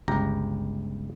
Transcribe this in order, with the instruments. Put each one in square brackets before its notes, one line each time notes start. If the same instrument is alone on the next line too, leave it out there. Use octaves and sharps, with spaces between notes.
[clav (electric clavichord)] G1 C#2 G4 A#5